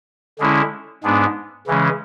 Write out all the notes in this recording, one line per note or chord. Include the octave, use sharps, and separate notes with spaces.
D3 G#3 C#4 E4
G#2 G#3 B3 D4
C#3 E3 G#3 C#4